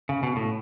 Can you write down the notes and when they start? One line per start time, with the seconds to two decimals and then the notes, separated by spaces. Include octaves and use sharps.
0.09 C#3
0.23 B2
0.36 A2